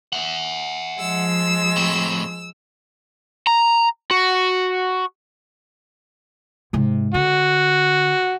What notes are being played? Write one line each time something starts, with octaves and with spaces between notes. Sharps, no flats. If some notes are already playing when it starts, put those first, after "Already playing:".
E5 F#5
F3 G#3 E6
A2 C4
A#5
F#4
G#2 C3
D3 F#4